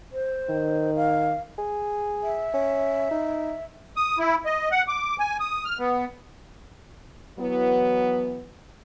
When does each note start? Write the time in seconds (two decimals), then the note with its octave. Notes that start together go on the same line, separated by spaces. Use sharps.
0.12 C5
0.50 D#3
0.96 F5
1.58 G#4
2.23 E5
2.54 C#4
3.11 D#4
3.96 D#6
4.19 E4
4.45 D#5
4.71 F#5
4.88 D6
5.19 G#5
5.40 D#6
5.65 F6
5.79 B3
7.40 E3 F#3 B3